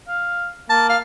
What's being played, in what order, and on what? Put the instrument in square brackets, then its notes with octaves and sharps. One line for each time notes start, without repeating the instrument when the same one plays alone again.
[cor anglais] F5
[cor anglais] A#3 [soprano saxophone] A5
[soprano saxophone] F5